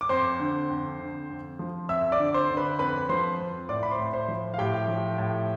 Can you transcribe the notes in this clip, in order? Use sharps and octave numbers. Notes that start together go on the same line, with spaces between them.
D6
F2 C5 C6
D3
F2
D3
F2
F3
F2 E5 E6
D5 D6
D3
C5 C6
D3
B4 B5
F2 B4 B5
F3 C5 C6
F2
A2 D5 D6
B5
C5 C6
A2
C5 C6
F3
F5
A2 G4 G5
F3
A2